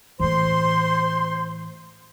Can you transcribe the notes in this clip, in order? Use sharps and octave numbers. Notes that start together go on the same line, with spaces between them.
A2 E3 C5 C6